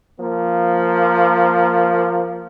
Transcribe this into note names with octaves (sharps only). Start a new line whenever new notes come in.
F3 A#3